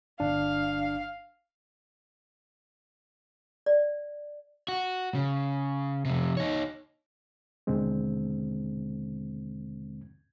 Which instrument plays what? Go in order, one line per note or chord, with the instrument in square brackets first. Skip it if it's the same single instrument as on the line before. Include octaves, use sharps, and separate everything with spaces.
[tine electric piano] G1 D4 [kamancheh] F5
[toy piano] D5
[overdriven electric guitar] F#4
C#3
F2 C3
D#4 C#5
[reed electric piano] D#2 B2 D3 G#3 C4